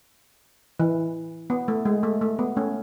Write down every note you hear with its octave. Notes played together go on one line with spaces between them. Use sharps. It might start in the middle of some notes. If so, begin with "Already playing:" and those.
E3
B3
A3
G#3
A3
A3
B3
A3 C#4